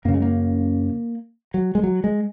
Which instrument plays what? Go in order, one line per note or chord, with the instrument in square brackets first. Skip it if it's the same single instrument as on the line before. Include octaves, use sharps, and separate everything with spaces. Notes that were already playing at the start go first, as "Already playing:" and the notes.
[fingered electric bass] F#2 C#3 A#3
G#3
A#3
F#3
G#3
F#3
G#3